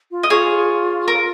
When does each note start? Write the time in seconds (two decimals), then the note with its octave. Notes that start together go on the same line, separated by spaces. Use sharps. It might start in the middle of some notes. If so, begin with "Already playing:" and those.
0.11 F4
0.23 D#5
0.30 F4 G#4 C#5
1.08 A#4